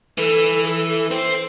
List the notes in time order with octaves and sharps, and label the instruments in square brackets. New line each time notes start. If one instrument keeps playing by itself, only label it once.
[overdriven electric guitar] E3 [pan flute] A4
[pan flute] A4
[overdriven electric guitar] C4